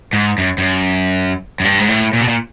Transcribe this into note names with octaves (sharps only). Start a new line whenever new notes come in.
G#2
F#2
F#2
F#2
G2
G#2
A2
A#2
B2
A#2